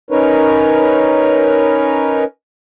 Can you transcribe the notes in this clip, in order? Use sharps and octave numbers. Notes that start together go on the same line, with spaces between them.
C#4 D#4 A#4 B4 C#5